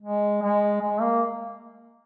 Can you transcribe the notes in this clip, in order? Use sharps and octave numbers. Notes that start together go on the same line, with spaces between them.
G#3
G#3
G#3
A#3